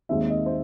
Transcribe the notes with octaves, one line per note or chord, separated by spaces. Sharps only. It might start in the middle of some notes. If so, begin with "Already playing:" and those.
D#2 D#3 G#3 C4 D#4 E5
D#5
C5